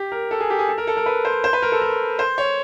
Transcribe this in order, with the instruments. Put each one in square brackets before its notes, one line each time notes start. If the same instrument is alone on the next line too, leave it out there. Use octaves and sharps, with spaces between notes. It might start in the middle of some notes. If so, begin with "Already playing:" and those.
Already playing: [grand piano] G4
A#4
A4
G#4
G4
G#4
A4
A#4
A4
A#4
B4
C5
C5
B4
A#4
A4
A#4
C5
C#5